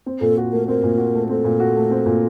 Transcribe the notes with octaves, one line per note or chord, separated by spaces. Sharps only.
C4
A#2 A4
F#4
A3 A#4
C4 A#4
A#2
F#4
A3
C4 A4
A#2
F#4
A3
C4
A#2